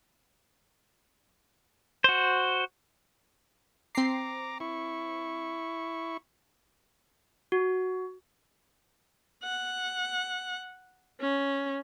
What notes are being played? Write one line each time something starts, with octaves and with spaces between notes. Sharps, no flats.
F#4 C5
C4 A#5 D6 C7
E4 C#6
F#4
F#5
C#4